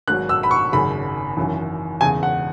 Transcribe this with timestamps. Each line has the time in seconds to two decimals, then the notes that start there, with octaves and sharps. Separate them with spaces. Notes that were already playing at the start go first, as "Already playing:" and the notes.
0.08 G#1 G#2 F#3 F#6
0.29 E6
0.43 B5
0.51 C#6
0.72 G#1 F#2 C#3 B5
1.37 G#1 F#2 E3
2.01 E1 E2 C#3 G#5
2.23 F#5